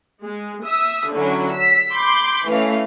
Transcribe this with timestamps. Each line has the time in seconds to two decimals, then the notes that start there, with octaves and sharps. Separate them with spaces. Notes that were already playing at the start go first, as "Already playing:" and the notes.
0.23 G#3
0.64 E5 D#6 E6
1.12 D3 F#3 C#4 E4
1.52 E6 B6
1.93 B5 C6 D6 G6
2.49 E3 A3 C#4 F5